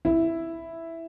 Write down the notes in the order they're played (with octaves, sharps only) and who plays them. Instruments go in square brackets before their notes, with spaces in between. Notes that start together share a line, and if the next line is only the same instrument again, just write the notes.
[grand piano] E4